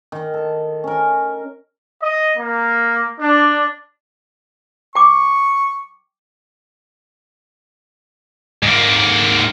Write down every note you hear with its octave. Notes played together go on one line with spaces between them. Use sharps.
D#3
A4
C#4 A#4
D#5
A#3
D4
G5 C#6 D6
G#2 A#3